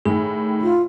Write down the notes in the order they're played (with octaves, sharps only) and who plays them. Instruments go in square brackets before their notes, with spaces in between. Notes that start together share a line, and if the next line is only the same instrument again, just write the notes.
[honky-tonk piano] A2 D#3 [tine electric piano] G#4
[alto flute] F4